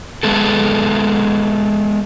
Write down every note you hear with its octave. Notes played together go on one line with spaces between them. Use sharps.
G#3 B3 A4